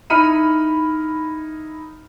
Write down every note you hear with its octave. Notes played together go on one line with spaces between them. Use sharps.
D#4 E4 B5 F6 C#7 D#7